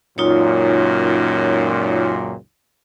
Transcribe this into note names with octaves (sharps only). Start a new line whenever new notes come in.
C#2 F#2 A#2 D#4 F4 C#5